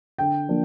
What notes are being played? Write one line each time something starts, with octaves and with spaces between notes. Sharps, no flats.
D3 G5
F3 A#3 D4